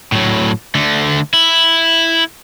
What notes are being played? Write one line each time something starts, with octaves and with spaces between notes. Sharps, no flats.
A2 F#3
D3 A3
E4